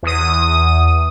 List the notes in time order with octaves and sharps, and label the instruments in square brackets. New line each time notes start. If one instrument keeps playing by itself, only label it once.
[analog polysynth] E2 D#6